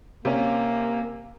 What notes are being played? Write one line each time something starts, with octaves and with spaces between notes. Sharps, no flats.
C3 A#3 C#4